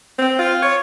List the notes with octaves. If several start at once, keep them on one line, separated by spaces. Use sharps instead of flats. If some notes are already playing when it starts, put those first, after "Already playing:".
C4
F4
C#5